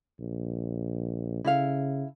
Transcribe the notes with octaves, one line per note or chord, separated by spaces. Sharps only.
A#1
C#3 E4 A4 F5